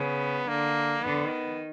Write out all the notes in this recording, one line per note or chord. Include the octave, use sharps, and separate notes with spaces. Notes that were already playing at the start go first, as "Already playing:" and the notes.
Already playing: C#3 B3
D3 A#3
D#3 B3